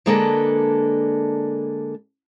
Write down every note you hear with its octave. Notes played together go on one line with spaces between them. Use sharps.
D3 G#3 A#3 D4 A4 B4